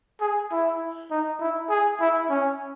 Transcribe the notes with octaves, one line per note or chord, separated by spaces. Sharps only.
G#4
E4
D#4
E4
G#4
E4
C#4